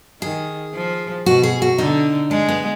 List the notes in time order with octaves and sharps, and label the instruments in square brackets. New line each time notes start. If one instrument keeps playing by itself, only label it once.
[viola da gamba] D#3 [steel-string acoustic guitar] G#4
[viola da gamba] F3
[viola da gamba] B2 [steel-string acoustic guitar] F#4
[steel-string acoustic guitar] G#4
F#4
[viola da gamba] D3 [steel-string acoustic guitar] D#4
[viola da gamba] G#3 [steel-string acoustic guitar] D4
[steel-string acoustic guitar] B3